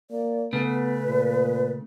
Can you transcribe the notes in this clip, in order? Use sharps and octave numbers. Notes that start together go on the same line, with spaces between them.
A#3 D5
C#3 A3 B3 B4
A#2